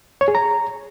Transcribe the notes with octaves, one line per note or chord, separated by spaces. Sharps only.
C#5
G#4
A#5